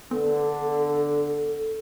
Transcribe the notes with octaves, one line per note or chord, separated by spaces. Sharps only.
D3 B3 A4